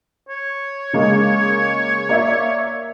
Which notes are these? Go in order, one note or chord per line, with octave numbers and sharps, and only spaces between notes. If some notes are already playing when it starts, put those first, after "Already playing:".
C#5
C#3 G#3 A#3
A#3 D5 E5